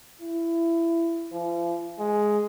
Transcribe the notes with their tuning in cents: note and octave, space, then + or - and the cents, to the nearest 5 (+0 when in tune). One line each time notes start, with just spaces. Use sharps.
E4 +20
F3 -40
G#3 +5